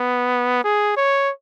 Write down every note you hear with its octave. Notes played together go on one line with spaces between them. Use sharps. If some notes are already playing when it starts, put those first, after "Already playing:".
Already playing: B3
G#4
C#5